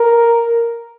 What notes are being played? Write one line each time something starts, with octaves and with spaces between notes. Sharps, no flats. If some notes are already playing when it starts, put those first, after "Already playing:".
Already playing: A#4